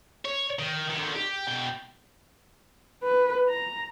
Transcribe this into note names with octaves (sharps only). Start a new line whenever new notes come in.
C#5
D#3
D3 D#3
G4
B2 G5
B4
A#5